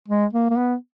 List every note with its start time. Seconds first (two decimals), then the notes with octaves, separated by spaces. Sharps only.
0.08 G#3
0.33 A#3
0.50 A#3
0.57 B3